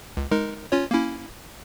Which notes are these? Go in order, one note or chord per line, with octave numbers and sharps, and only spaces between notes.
C#2
G#3 D#4 A#4
C#4 F4 C#5
A#3 C#4 E4